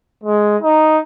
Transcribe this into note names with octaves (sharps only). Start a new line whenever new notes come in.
G#3
D#4